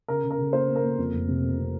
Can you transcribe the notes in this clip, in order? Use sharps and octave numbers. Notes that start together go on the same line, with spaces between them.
C#3 A#4
C#3
A#4
C#3
A#3 C5
A#3
A#4
A#3
F2
F1
C3
C3
C3